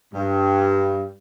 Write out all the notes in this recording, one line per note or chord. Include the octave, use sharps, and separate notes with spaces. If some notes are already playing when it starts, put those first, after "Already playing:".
G2